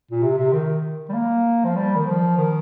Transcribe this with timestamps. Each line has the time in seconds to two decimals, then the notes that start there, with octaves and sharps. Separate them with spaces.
0.11 A#2
0.22 C3
0.37 C3
0.53 D#3
1.09 G3
1.14 A#3
1.64 F3
1.76 G3
1.96 D#3
2.06 F3
2.37 D#3